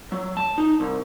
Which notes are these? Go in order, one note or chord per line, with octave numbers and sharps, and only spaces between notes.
F#3
A5
D#4
C2